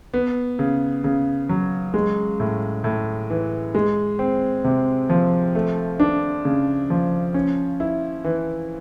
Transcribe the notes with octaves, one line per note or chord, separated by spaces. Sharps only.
B3
C#3
C#3
F#3
G#3
A2
A2
E3
G#3
C4
C3
F3
A3
D4
C#3
F3
C#4
E4
E3